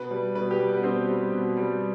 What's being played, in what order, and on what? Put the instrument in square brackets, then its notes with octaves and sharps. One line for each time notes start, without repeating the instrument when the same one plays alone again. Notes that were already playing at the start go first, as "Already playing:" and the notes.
Already playing: [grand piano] B2 B4
G3
B2 B4
G4
G3
B3
B2 C4
G3
B2
G3